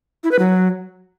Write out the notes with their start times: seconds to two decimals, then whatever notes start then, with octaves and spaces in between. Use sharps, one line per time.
0.24 E4
0.31 B4
0.39 F#3